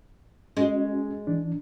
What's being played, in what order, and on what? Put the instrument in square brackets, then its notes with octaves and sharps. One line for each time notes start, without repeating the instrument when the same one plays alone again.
[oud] G#3 [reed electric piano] C#4 F#4
[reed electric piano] E3 D4